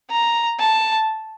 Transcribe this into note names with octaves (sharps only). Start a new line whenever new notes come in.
A#5
A5